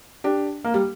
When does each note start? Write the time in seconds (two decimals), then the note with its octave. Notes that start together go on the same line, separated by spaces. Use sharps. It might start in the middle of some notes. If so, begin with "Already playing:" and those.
0.24 D4 G4
0.64 A#3
0.74 G3